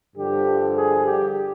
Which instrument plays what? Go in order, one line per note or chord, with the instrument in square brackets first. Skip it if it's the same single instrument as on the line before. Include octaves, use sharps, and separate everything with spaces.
[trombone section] G2 D3 F3 G4
G#4
G4